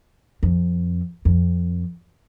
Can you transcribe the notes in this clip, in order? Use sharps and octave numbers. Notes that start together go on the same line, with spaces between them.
F2
F2